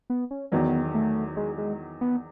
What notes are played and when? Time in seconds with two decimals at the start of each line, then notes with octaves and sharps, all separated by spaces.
0.10 B3
0.31 C#4
0.51 E2 D#3 F#3 B3
0.94 A3
1.37 G#3
1.58 G#3
2.01 B3